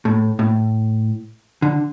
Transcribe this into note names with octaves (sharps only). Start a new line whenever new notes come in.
A2
A2
D3